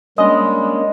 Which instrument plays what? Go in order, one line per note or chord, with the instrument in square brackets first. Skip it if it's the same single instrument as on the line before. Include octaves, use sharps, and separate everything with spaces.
[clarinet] G3 [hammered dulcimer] G#3 [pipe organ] A#3 C#4 D4 [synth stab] D#5